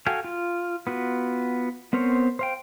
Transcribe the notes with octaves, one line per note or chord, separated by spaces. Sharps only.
F#4 A4 F5 G5 G#5
F4
B3 F4 F#4
B3 C4 A#4 C5 C#5
C5 F5 G5